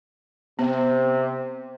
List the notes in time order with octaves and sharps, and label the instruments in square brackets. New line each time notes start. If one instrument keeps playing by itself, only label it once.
[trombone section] C3 [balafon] B3